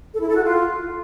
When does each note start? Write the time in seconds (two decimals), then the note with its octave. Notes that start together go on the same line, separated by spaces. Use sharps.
0.13 A4
0.20 E4
0.28 A4
0.36 F#4
0.44 F4